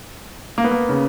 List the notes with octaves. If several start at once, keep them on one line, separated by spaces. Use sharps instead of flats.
A#3
B3
A#3
C#3